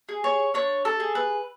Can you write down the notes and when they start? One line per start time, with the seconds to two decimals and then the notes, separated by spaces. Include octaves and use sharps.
0.09 G#4
0.24 C#5
0.54 D4 C#5
0.85 A4
1.00 G#4
1.15 B4